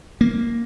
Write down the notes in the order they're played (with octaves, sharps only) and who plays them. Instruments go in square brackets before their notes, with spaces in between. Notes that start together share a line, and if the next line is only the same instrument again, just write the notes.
[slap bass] A#3